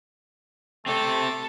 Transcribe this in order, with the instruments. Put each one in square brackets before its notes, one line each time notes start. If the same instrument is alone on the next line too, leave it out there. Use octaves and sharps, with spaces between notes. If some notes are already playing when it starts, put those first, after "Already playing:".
[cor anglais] A3 [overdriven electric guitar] C4 G4 [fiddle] A4